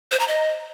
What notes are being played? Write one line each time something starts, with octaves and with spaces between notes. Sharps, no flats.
C5
A#5
D#5